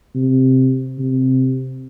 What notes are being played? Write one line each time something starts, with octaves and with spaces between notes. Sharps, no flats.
C3
C3